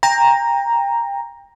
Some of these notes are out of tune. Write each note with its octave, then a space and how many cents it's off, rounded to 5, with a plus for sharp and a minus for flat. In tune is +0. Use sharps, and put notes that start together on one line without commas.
G5 +25 A#5 +0